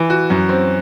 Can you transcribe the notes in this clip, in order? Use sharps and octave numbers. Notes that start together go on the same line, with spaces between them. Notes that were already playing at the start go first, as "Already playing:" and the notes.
Already playing: E3
F#4
F#2
C4